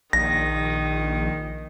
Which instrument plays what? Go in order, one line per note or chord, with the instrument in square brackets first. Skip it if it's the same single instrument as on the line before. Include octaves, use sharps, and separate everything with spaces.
[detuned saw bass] A#1 [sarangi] D#3 [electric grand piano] A#6